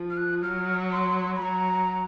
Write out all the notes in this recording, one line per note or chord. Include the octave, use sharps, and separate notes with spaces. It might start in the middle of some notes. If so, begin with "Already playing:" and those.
Already playing: F3
F6
F#6
F#3 F6
C6
B5
F#3 A#5